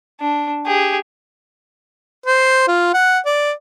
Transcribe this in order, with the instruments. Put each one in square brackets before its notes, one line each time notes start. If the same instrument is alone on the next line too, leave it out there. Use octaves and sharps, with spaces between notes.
[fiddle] D4
G4 G#4
[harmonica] C5
F4
F#5
D5